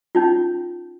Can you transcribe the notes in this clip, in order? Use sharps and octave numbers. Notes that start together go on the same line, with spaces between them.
C#4 D#4 F4